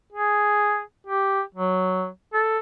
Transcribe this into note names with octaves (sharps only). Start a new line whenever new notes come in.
G#4
G4
F#3
A4